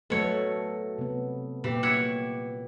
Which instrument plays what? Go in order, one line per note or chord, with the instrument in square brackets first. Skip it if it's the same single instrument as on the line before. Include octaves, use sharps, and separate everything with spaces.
[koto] B2 C#5 [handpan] F#3 A3 A4
[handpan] C3 B3
[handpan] A#2 G4 [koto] E3
[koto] E4 C#5 F#5